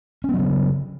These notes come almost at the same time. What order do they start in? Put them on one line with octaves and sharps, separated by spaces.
C#4 B3 F#3 C#3